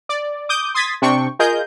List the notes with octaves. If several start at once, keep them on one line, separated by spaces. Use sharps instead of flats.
D5
D6 D#6 G6
C6 D#6 G#6 A6 B6
C3 C4 D4 G5 C#6
F4 G#4 A#4 D#5 G6